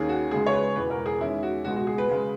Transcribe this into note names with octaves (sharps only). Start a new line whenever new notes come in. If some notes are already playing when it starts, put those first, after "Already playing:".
Already playing: D#2 D#3 A#3 C#4 G#4
F#4
C#2 C#3 G#3 G#4
C#5
B4
E1 E2 B2 B4
A#4
G#4
E2 D#3 G#3 C#4 E4
F#4
C#2 B2 G#3 F#4
F#4
G#4
B4
C#3 G#3